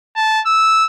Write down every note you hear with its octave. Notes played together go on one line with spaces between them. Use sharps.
A5
E6